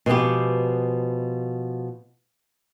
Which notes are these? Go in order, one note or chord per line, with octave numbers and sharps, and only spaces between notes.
B2 F3 G#3 B3 G4